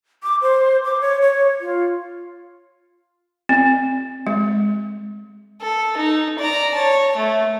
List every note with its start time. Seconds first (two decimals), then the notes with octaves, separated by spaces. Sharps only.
0.23 D6
0.42 C5
0.85 D6
1.01 C#5
1.22 C#5
1.61 F4
3.49 C4
4.27 G#3
5.61 A4
5.97 D#4
6.39 D5 A#5
6.74 C#5 A5
7.16 A3